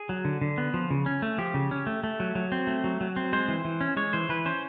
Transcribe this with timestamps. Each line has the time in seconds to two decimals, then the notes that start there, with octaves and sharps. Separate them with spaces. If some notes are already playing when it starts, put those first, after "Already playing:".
Already playing: G#4
0.09 F#3
0.25 D3
0.41 D3
0.58 B3
0.74 F3
0.90 C#3
1.06 C#4
1.22 A3
1.38 F3 G4
1.54 C#3
1.71 C#4
1.86 A3
2.04 A3
2.20 F#3
2.35 F#3
2.52 C4
2.67 A3
2.84 F#3
3.01 F#3
3.16 C4
3.33 G#3 C5
3.48 E3
3.65 E3
3.81 C#4
3.97 G#3 C#5
4.13 E3 C5
4.29 E3 B4
4.45 C#4 C5